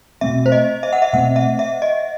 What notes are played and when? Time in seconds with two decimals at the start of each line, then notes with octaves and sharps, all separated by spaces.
0.21 B2 A3 C4 E5
0.46 C5
0.52 D#5
0.83 E5
0.93 F#5
1.02 E5
1.13 B2 A3 C4 F#5
1.36 E5
1.59 E5
1.82 D#5